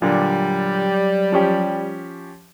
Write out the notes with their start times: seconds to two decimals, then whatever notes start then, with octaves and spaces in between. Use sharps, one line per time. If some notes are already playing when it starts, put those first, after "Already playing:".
0.02 A#2 D3 F#3 G3
1.32 F3 C#4 G4